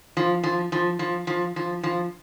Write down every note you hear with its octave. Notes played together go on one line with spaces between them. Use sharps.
F3
F3
F3
F3
F3
F3
F3